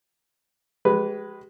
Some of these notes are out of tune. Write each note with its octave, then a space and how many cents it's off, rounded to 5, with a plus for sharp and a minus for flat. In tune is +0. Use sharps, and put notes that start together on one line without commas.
G#3 +0 G4 -35 B4 +0